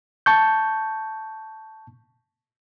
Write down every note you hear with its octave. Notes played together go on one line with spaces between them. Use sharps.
A5 C#6 G6